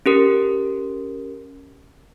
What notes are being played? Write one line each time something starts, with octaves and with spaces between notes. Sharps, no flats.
C#4 G4 A#4